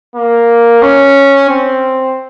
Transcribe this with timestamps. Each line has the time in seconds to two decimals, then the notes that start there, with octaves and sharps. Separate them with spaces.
0.16 A#3
0.82 C#4
1.50 C4